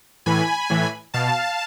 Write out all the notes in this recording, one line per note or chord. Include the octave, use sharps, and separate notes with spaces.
A2 E3 G#5 B5
A2 E3
B2 F5 A5